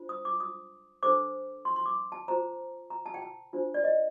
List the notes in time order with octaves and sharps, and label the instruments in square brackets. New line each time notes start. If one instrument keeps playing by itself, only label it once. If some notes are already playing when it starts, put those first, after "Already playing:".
Already playing: [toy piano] D4 F4 C5
D#6
D6
D#6
D4 A4 C5 D6
C6
C6
D6
A5
F4 C5 A#5
A#5
A5
G5
A5
D4 F4 C5
D5
D#5